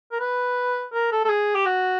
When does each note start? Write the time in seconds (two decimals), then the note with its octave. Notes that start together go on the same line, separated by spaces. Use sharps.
0.12 A#4
0.20 B4
0.93 A#4
1.12 A4
1.24 A4
1.29 G#4
1.55 G4
1.65 F#4